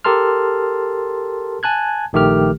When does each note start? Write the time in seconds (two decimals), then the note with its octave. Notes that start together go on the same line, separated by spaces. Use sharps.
0.05 G4 A4 A#4 A5 C6 F6
1.63 G#5 A5 F#6 G#6
2.13 A#1 D#3 A3 G4 F6